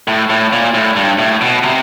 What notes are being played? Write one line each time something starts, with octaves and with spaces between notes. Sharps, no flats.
A2
A2
A#2
A2
G2
A2
B2
C3